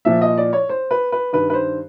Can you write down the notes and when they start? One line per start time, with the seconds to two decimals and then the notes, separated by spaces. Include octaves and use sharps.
0.05 A#2 F3 E5
0.22 D#5
0.38 D5
0.53 C#5
0.69 C5
0.91 B4
1.12 B4
1.33 G2 D#3 B4
1.50 B4
1.54 C5